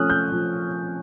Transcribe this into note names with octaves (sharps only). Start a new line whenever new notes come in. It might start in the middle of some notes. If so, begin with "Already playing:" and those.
Already playing: F3 A3 C#4 D#6 F6 F#6
G6
F3